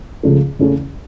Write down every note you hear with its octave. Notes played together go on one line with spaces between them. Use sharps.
C#2 C#3 F3 A3
E2 C#3 E3 A3 C#4